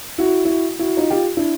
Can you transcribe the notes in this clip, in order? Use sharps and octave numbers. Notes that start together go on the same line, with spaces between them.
E4 F#4
E4 F#4
E4 F#4
D#4 F4
F4 G4
D4 E4